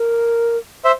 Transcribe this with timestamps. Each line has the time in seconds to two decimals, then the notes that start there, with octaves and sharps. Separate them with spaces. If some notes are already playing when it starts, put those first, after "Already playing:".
Already playing: A#4
0.85 C5 E5